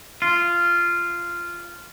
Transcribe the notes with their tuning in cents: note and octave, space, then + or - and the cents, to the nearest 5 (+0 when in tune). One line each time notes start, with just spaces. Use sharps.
F4 -10